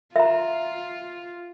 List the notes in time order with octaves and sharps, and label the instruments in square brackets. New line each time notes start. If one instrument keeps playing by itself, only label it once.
[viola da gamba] F4 [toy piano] E5 A#5